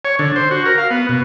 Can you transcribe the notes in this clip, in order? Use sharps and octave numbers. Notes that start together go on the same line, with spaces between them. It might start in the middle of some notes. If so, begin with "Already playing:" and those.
C#5
D3
C5
F#4
A#4
F5
B3
B2